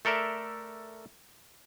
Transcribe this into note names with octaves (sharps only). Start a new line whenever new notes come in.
A3 A4 A#4 D5 E5